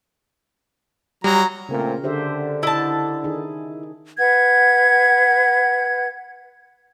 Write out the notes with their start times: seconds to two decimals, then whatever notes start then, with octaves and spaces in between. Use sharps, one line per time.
1.24 F#3 G3 A#5
1.69 A#2 C#3 A3 C4 A#4
2.04 D3 G4 C5 E5
2.63 E4 D#5 A5
3.24 D#3 D#4 G#4
4.18 B4 F#5 G#6